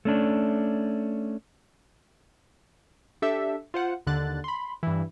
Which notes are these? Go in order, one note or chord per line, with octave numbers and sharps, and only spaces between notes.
A3 C#4 D4
D4 G4 A4 E5
F4 C5 F#5
D#2 D3 F#6 A6
B5 C6
G2 E3